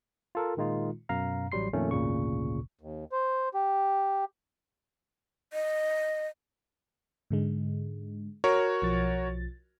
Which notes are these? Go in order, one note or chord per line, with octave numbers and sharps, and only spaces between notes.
F4 A4 A#4
A#2 D#3 G#3 D#4 F4
F#2 B2 F5 A#5
A1 F#3 G3 C6 C7
F2 A#2 D#3 A3 C#4
G#1 D2 A#2 C#3 C#6
D#2
C5
G4
D#5
G#2 D3 G#3
F#4 A#4 C#5
B1 F3 A6